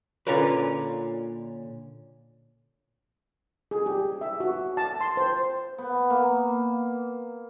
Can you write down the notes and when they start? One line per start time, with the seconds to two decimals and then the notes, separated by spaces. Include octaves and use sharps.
0.27 A#2 D3 C#4 F4 A#4 B4
3.71 G#4
3.86 G4
4.21 E5
4.40 F#4
4.77 A5
5.01 C6
5.17 C5
5.78 B3
6.10 A#3